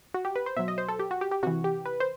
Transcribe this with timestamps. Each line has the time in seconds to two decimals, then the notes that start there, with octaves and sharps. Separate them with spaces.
0.14 F#4
0.25 G4
0.36 B4
0.46 C5
0.57 B2 F#3 E5
0.68 D#5
0.78 C5
0.89 A4
0.99 G4
1.11 F#4
1.21 G4
1.31 G4
1.43 C3 E3 F#4
1.64 G4
1.85 B4
2.00 C5